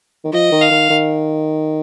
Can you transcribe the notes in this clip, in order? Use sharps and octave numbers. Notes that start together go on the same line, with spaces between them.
D#3
F3 D#5
D#3
F5
D#3
D#3